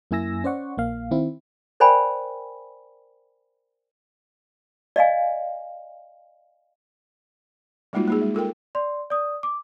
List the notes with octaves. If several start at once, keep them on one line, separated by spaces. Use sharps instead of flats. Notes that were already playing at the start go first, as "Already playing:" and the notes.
F#2 A#3 E4 G#5 E6 A#6
C#4 C5 D5 F#5 C#6
A#1 A#3 F5
D#3 C4 E4
A#4 C5 D5 G5 G#5 B5
D5 D#5 F5 G#5
G3 G#3 A#3 D#4 F4 F#4
A#3 D#4 G#4
G#3
F4 A4 A#4 G5
D5 C6
D5 D#6
D6